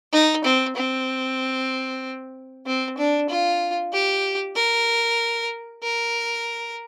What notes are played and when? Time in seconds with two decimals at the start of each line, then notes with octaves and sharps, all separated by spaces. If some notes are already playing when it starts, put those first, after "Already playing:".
0.13 D#4
0.45 C4
0.76 C4
2.66 C4
2.98 D4
3.29 F4
3.93 G4
4.56 A#4
5.83 A#4